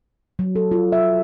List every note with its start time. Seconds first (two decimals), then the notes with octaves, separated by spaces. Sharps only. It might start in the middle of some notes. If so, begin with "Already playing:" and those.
0.39 F#3
0.55 A4
0.71 F4
0.92 E5